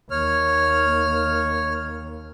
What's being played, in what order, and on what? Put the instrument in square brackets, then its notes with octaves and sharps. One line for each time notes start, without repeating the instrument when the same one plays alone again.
[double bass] D#2 [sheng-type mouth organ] C#5 F6